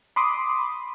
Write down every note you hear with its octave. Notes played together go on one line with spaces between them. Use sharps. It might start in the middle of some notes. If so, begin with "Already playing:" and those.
B5 C6 D6 D#6